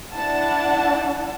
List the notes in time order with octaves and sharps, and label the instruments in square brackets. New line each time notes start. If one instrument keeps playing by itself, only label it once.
[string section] D4 E4 F#5 A5